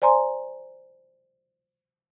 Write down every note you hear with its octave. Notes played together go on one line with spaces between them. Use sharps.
C5 D5 G#5 A#5 C6